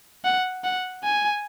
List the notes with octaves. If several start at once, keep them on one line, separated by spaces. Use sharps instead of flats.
F#5
F#5
G#5